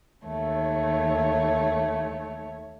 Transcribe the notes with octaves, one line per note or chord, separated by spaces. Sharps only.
D#2 A3 C#5